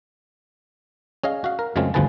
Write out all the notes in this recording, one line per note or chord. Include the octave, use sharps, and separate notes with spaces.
C#4 G#4 D#5 F5
F#4 F5
A#4
F#2 C#3 G#3 A3 C4 F4
G1 D2 F3 G#4 B4 A5